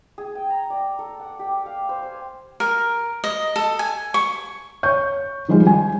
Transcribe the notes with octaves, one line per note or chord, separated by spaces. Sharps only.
G#4
G5
A#5
D5
A4
F#5
G4
F5
C5
G#5
A#4
D#5
A4
G#5
C#6
C#5 C#6 G6
D#3 F3 G3 G#3 F4
G#5